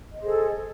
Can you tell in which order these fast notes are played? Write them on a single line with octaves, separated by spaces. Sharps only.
D#5 C5 G#4 A4